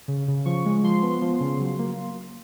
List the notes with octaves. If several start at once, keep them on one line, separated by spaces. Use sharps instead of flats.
C#3
C#3
F3 C#6
G#3
F3 C6
B3
F3
C#3
F#3
A#3